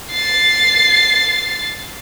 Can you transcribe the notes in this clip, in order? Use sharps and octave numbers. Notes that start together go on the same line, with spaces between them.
A6 C7